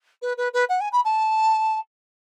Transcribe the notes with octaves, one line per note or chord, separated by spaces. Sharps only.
B4
B4
B4
F#5
G#5
B5
A5